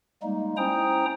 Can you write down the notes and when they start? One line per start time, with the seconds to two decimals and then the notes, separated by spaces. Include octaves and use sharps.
0.23 G3 G#3 A#3 D#4
0.57 C#4 E4 C5 G5 A#5 D#6